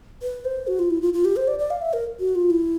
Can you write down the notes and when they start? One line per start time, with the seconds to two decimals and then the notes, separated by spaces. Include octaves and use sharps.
0.22 B4
0.45 C5
0.67 F#4
0.79 F4
0.90 E4
1.02 F4
1.14 F4
1.25 G4
1.36 C5
1.48 D5
1.59 D5
1.71 F5
1.82 E5
1.93 A#4
2.20 F#4
2.35 F4
2.50 E4